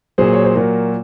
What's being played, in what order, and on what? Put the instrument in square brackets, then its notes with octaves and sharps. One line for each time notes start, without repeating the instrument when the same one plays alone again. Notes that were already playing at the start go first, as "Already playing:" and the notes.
[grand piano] A#2 F#3 G#4 C5
C#5
C5
A#2 F#3 F#4 A#4